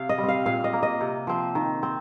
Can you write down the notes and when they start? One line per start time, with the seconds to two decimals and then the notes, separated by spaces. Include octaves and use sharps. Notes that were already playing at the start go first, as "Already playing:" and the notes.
Already playing: C3 F5
0.09 D#5
0.18 G3
0.23 C4
0.28 F5
0.46 A#2 F5
0.64 D#5
0.73 A#3
0.83 D#5
1.01 C3
1.27 F3 C4
1.55 D#3
1.83 C4